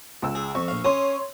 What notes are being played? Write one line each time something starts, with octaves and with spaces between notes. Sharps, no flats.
C#2 E6
G#4
F2 C#6
A#1 F5
C#4 C#5 C6 D#6